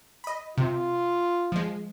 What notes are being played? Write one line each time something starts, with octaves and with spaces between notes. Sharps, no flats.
D#5 B5
C3 F4
F3 G#3